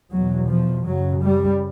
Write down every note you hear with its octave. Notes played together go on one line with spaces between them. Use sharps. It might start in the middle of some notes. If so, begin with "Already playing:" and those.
E2 B2 F#3
F3
F#2 C#3 F#3
G3